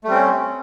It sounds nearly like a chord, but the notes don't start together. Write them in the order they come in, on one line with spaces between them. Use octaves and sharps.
A3 G3 C4 C#4